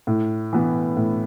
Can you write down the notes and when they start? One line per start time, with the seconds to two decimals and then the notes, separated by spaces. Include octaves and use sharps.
0.07 A2
0.53 E3 B3 E4
0.97 A2